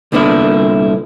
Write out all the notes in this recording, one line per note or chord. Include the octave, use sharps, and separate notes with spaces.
C2 A#2 D3 B3 D4 E4